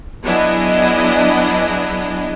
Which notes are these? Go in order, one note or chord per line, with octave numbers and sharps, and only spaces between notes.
F#3 B3 D4 E4 G#4 D#5